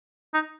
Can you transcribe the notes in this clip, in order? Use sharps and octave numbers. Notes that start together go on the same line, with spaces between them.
D#4